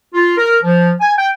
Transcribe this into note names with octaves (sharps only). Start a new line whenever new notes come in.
F4
A#4
F3
G#5
G5